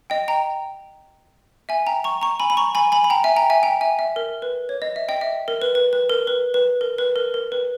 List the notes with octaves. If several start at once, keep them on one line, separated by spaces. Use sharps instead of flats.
D#5 G5
G5 A#5
E5 G#5
G5 A#5
A#5 C#6
A#5 C#6
G#5 B5
B5
A#5 C#6
G#5 B5
G#5 B5
B5
G5 A#5
E5 G#5
G5 A#5
E5 G#5
G5 A#5
E5 G#5
E5
A#4
B4
C#5
D#5
E5
D#5 G5
E5
A#4
B4
B4
B4
A#4
B4
B4
A#4
B4
A#4
A#4
B4